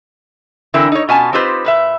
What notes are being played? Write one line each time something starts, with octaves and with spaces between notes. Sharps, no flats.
D3 E3 C4 E4 A#4
D#4 C#5
B2 B3 C#4 F4 G#5 A5
C4 D#4 F4 G4 B4 C5
A#2 B4 E5